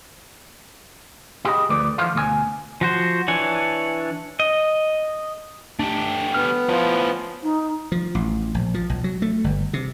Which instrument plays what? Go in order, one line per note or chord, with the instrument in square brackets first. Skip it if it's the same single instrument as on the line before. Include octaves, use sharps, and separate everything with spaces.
[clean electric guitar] E4 G4 G#4 B4 D#5 B5
D2 F3 A3 B4 D5
E3 F3 E4 A4 C5 F5
D2 B2 F#4 G#5
[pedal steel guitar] F3 F#4 C5
E3 D4 C#5 G#5
D#5
[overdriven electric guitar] A3 G4 [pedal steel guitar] D4
[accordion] B3 [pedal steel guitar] F6
[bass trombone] F3 [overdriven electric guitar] C#4 E4
[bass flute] D#4
[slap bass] F3
A1
A#1
F3
B1
F#3
A3
G1
C3